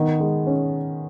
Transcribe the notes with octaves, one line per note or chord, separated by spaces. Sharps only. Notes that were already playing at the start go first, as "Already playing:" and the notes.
Already playing: D#3 B3
G#3
C#4